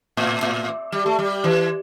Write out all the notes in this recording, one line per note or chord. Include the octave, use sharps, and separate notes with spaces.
A2
A2
G3
A3
G3
E3